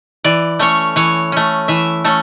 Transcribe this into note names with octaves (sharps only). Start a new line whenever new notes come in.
E3 D5
A3 C#4 C#5
E3 C#5
A3 C#4
E3 E5
A3 C#4 A4